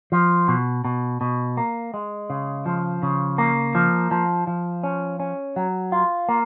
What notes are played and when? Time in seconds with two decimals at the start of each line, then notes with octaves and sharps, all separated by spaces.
0.12 F3
0.48 B2
0.85 B2
1.21 B2
1.57 A#3
1.94 G#3
2.30 C#3
2.66 F3
3.03 C#3
3.38 A#3
3.75 F3
4.11 F3
4.47 F3
4.83 C#4
5.20 C#4
5.56 F#3
5.92 F4
6.29 A#3